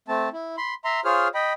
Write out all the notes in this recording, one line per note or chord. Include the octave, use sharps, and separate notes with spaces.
A3 C4 A5
E4
B5 C6
E5 A#5 C6
F4 G#4 C5 C#5 F6
D#5 G5 B5